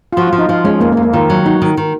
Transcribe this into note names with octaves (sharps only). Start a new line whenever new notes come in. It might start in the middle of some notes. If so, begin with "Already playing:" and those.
F4
F3 F#4
F4
F3
D#4
F3 F4
G#3 C#4
F2 A#3
A#3
F2
A#3
D#3 F4
F#3
D#4 F#4
D#3
D#3